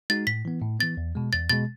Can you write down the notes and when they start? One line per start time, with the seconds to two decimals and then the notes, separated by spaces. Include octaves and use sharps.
0.10 G#3 D#4 F#4 A6
0.27 A2 B6
0.45 E3 B3
0.62 A2
0.80 E3 B3 A6
0.97 E2
1.15 B2 G#3
1.33 E2 A6
1.50 B2 G#3 A6